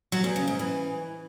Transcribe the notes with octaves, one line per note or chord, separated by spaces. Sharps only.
F#3
E2
C#3
G#2
E3